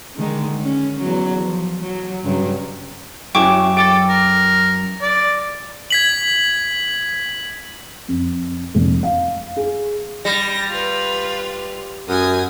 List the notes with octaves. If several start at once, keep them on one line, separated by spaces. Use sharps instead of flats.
D3 D#3 G#3
C#4
E2 E3 F#3
F3
F#3
G2 C#3 F#3
F#2 E4 G#4 G5 C#6 D6
A4 G5 D6 A6
A#4
D5
G#6 B6 F#7
F2
F1
F5
G#4
G3 A#6
F4 B4
F#2 G#5 D#6